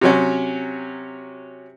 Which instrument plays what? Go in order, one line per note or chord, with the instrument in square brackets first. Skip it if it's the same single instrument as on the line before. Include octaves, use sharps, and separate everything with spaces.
[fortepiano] C3 F#3 C#4